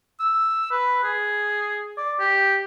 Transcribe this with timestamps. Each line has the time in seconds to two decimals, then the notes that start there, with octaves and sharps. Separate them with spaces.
0.20 E6
0.71 B4
1.04 G#4
1.98 D5
2.20 G4